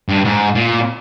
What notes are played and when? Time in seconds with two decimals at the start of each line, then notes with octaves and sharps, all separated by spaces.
0.09 G2
0.25 G#2
0.55 A#2